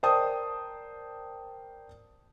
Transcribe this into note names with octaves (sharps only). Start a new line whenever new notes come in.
A#4 C5 D5 G5 A5 D#6